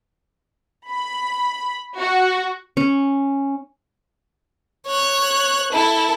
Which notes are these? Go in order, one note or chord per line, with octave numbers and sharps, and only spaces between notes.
B5
F#4
C#4
C#5 F#6
E4 A4